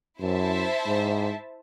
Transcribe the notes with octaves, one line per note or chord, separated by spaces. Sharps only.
F#2 E4 C5 E5 A5
G#2